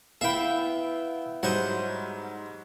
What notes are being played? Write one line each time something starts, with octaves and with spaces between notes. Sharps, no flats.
B3 E4 E5 F5 G5 B5
G#2 F#3 G3 G#4 C5 F#5